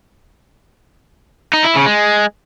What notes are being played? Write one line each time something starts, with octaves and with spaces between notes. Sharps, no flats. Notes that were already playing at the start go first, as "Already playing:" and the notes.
D#4
E4
C#3
G#3